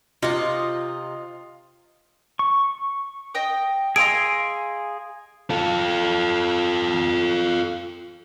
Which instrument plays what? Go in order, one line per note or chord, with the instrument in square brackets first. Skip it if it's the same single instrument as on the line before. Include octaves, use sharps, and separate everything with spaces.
[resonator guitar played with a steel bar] C3 [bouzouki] D#4 D#5 [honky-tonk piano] F4
[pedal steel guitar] C#6
[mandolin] D#5 G5 D#6
[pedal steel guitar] G#4 G#5 C6 [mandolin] D#5 F5 E6 [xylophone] D7
[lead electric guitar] F4 A4